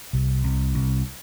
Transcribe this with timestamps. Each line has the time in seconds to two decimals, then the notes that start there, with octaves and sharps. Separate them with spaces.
0.13 C2
0.44 C2
0.75 C2